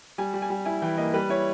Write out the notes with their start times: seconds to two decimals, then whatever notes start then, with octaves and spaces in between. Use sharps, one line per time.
0.18 G3 G#5
0.34 G3
0.42 G#5
0.50 G3
0.65 E4 G#5
0.82 E3 G5
0.97 A#3 D#5
1.14 G3 B4
1.30 E4 C#5